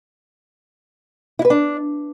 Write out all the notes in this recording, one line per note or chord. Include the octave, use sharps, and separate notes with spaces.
E4
B4
D4